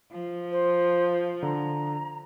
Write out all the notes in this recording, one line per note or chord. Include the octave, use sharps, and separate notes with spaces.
F3
C5
D3 A#5